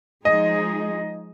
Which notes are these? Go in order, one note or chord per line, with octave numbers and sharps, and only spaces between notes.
F3 G#3 D#4 G#4 D#5